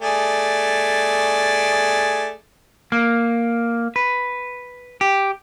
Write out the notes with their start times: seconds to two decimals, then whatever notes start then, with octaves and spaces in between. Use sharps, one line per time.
0.02 A3 G#4 D5
2.92 A#3
3.96 B4
5.01 G4